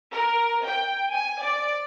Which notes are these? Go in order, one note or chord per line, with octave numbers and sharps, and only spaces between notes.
A#4
G5
G#5
D5